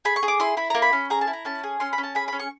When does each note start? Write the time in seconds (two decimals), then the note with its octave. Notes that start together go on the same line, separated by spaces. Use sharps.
0.05 G#4 B5
0.16 C#6
0.23 G#4
0.28 D6
0.40 E4 C6
0.57 E4 B5
0.70 A#3 A#5
0.82 B5
0.93 C#4
1.10 G#4 A#5
1.21 A5
1.27 E4
1.33 A#5
1.45 C#4 A5
1.63 G#4
1.80 C#4 C6
1.93 B5
1.98 C#4
2.03 A5
2.15 G#4 B5
2.28 C#4 B5
2.40 C#6